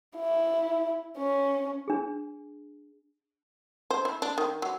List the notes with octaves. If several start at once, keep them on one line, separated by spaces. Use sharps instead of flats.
E4
C#4
D4 G#4
C5
E4
D4
D#3
F#3